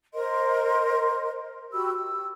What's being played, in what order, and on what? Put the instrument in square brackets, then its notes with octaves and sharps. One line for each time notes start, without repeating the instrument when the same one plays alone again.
[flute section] A#4 C5 D#5 C6
F#4 G4 B5 E6
E6